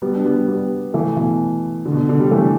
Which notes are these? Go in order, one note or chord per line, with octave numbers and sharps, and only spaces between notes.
G3 B3
D4
G3 B3
G3 B3
E3 A3
B2 E3
D3
B2
D3
D3
D3 G3
E3 A3